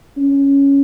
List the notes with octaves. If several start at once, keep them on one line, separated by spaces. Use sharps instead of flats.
C#4